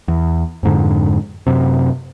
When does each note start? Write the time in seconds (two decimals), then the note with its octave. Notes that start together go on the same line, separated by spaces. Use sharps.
0.08 E2
0.63 F2 G#2 D3
1.47 F#2 C3